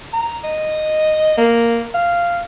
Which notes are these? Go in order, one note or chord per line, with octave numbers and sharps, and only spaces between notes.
A#5
D#5
A#3
F5